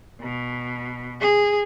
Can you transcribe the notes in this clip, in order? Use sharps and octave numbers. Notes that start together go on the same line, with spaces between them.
B2
G#4